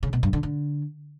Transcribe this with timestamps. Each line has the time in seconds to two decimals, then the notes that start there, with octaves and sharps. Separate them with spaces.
0.03 C#3
0.13 B2
0.23 G2
0.33 D3
0.43 D3